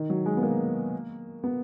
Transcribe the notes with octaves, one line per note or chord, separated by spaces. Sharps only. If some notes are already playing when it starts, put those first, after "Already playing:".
Already playing: D#3
F#3
G#3
B3
A#3
B3